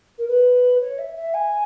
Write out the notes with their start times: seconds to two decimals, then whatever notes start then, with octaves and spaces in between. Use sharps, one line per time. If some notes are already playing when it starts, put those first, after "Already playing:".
0.18 A#4
0.28 B4
0.81 C#5
0.98 E5
1.16 E5
1.34 G#5